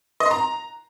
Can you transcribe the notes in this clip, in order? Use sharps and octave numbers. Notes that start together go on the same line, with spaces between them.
D#5
C6
A#5